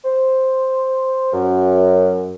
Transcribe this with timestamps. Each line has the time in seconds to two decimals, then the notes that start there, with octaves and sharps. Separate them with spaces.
0.04 C5
1.33 F#2